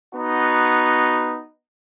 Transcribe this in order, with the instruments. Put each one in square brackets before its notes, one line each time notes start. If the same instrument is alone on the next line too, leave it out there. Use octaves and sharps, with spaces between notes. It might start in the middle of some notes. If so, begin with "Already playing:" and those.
[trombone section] B3 D#4 F#4